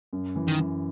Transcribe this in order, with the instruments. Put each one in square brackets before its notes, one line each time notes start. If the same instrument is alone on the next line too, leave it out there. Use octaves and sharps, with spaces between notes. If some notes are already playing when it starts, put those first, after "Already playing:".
[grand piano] F#2
E3
[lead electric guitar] D#3
[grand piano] F#2